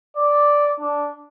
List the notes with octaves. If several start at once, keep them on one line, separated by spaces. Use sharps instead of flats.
D5
D4